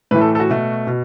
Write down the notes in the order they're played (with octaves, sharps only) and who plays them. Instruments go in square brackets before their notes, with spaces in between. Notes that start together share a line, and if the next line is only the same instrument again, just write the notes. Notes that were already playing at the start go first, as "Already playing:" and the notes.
[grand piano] A2 B4
E3 A3
A4
A4
F#4
B2 A3
B2